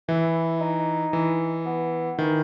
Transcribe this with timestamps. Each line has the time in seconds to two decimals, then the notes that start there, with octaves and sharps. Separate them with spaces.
0.09 E3 E4
0.60 D#4
1.13 E3
1.65 B3
2.18 D#3 E3